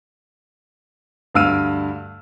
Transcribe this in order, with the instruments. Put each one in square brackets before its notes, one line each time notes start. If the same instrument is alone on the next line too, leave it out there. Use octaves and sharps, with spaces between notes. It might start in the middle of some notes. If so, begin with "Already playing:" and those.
[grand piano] D2 G2 F5 E6 F6 D#7